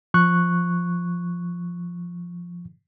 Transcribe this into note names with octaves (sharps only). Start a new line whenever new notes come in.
F3 C#6 F#6